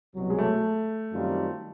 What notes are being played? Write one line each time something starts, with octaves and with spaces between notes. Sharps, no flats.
C2 B2 F#3
G#3
A3
F#2 D#3 G3 C4 F4